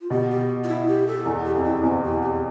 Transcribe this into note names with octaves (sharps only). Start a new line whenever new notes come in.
F4
B2 G4
G4
F4
E4
G4
A4
E2
G4
F2
E4
E2 C4
G4
G4